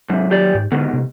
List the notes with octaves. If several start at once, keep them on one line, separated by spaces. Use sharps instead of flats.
G#2 C3 F#3
D#2 G4 D5
G#2
E2 G#2 B2 D3
C3